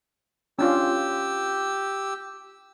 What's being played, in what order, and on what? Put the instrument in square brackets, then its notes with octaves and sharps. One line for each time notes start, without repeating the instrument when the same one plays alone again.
[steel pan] C#4 D4 F4 [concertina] G4 E6